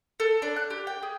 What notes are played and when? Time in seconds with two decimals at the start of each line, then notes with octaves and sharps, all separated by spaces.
0.20 A4
0.42 D4
0.56 F#6
0.70 G4
0.87 G5
1.03 G#4